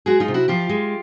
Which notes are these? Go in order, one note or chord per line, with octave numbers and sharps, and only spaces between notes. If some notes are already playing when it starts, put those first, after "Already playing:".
G#3 F#4 G#4
D#4 F4
C3
E4 F#4
F3 F4 G4
G#3